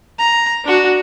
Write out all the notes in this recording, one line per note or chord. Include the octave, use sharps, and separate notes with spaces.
A#5
D4 F#4